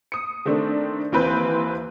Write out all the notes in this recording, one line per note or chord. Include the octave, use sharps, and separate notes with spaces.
D#6 C#7
D#3 A3 C4 D4
D#2 E3 C4 B4 G6